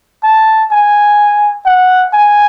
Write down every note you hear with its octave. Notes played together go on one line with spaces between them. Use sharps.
A5
G#5
F#5
G#5